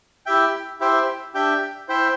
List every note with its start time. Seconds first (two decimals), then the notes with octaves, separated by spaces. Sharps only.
0.26 E4 G4 E5 G5
0.80 E4 G4 C5 E5 G5
1.34 D4 G4 E5 G5
1.88 E4 C5 E5 G5